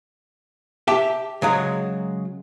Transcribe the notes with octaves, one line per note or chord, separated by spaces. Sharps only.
G4 E5 G5 A5
C#3 F#3 G#3